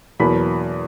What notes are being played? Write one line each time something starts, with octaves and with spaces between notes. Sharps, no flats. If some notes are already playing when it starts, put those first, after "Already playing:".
E2 B2 F#3 A#3 B5